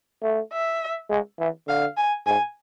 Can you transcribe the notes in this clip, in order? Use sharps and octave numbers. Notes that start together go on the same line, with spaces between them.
A3
E5
G#3
E3
D3 F5
G#5
G#2 G#5